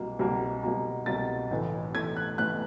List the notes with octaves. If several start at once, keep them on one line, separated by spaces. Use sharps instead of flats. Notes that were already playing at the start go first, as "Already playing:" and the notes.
Already playing: C2 B2 F#3 A#3
C2 B2 F#3 A#3
C2 B2 F#3 A#3
C2 B2 F#3 A#3 A6
A1 A2 E3 A3
A1 A2 E3 A3 G#6
F#6
A1 A2 E3 A3 F#6